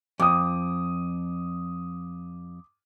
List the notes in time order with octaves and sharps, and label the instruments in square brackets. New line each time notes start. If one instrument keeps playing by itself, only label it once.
[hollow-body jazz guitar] F2 [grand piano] D6 D#6